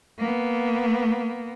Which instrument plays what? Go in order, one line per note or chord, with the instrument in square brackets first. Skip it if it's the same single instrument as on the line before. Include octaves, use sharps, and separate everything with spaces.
[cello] A#3 B3